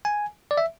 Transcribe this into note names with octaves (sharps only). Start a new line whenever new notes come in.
G#5
D5
E5